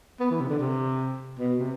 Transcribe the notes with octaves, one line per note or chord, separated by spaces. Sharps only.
B3
E3
C3
D3
C3
B2
C3